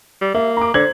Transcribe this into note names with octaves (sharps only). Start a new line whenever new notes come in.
G3
A#3 E5
A#5 D6
D3 C5 G#6 F#7